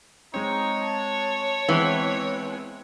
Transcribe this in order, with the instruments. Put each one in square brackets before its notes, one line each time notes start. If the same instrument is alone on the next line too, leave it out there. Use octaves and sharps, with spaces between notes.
[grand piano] G#3 C4 [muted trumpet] D#4 [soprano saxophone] C#5
[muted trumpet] A5
[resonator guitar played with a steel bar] E3 [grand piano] G#3 B3 C4